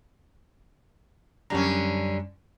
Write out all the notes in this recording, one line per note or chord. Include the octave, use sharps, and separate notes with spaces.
F#2 D3 G3 C#4 A#5